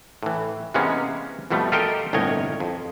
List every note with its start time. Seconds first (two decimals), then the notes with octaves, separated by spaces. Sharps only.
0.23 A2 E3
0.74 C3 E3 G#3 A#3 B3 C#4
1.51 F2 B2 F3 G3 A3
1.72 F4 G4 A4 A#4 D#5 G5
2.13 G1 C2 A2 C#5 D#5 G#5
2.60 F2